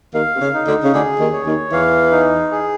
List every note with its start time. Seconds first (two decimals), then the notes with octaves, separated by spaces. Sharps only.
0.14 D#2 D#3 F5
0.36 C3
0.40 C#3
0.54 D#4
0.67 D2 D3
0.84 C#3
0.93 D2 D3 G#4
1.19 D#2 D#3
1.33 C#5
1.46 D#2 D#3
1.72 E2 E3 F5
2.11 D#4
2.51 G#4